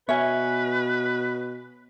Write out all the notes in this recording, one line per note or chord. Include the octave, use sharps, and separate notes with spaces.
B2 B4 C#5 E5 G#5